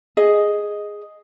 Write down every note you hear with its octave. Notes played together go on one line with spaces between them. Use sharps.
G#4 D#5